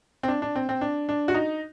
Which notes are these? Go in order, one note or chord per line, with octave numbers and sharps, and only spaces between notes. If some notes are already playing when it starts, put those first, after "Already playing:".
C4
D4
D4
C4
C4
D4
D4
F#4
D#4